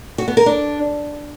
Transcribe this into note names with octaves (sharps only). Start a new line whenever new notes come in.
F#4
B3
A#4
D4